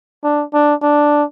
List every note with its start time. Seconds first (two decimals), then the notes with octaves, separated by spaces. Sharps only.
0.24 D4
0.54 D4
0.83 D4